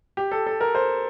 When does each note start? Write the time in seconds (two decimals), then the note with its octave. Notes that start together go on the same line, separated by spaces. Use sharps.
0.17 G4
0.31 A4
0.46 A4
0.61 A#4
0.75 C5